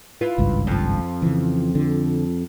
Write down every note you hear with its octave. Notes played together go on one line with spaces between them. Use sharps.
E4 F4 B4
G#1 C#2 G2
F2 F3
C#3 E3
D3